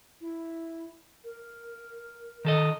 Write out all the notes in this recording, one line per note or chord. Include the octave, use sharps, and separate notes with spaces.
E4
A#4
D#3 A4 D#5